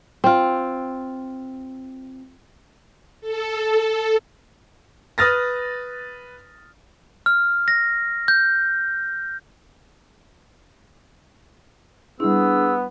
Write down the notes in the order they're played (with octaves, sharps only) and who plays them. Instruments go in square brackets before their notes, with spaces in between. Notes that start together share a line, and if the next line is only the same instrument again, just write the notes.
[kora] C4 F4
[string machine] A4
[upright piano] B4 D#6 F6 A6 A#6
[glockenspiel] F6
A#6
G6
[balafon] G3 E4 [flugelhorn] B3 [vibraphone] D4 [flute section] G#4 E6